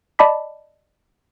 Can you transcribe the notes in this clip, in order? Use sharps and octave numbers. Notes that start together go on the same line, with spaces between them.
D5 D#5 A5 B5 D6 B6